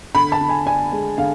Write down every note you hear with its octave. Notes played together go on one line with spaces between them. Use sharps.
D3 B5
A5
D3
G#5
D4 G#5
G#3
D3 F5